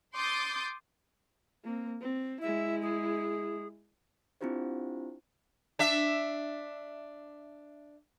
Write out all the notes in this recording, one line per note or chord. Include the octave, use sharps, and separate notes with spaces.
C6 D6 D#6 G6 A6
A#3 C4
C4
G#3 E4 E5
G#4
C4 D4 E4 F4 G4 C5
D4 E5